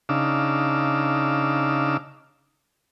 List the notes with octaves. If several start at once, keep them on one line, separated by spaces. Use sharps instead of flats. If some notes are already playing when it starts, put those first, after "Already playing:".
C#3 D4 D#4 F5 D6 E6